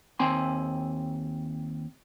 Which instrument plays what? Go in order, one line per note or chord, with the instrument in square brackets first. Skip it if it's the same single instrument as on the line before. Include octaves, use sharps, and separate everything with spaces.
[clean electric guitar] D#2 C4 G#5 C6